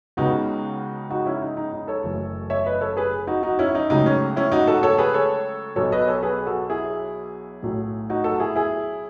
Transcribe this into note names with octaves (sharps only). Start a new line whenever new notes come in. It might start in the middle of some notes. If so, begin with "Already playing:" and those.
C#2 C#3 G#3 B3 D#4 F#4
D#4 F#4
C#4 E4
D#4
D#4
D#4
A4 C#5
F#1 F#2 E3 A3
C#5 E5
B4 D#5
A4 C#5
G#4 B4
D#4 F#4
D#4 F#4
C#4 E4
D#4
C#2 C#3 F#3 A3 D#4
C#4
C#4 E4
D#4 F#4
F#4 A4
A4 C#5
G#4 B4
A4 C#5
B1 B2 F#3 A4 C#5
B4 D#5
A4 C#5
G#4 B4
F#4 A4
E4 G#4
B1 A2 F#3 A3
D#4 F#4
F#4 A4
E4 G#4
E4 G#4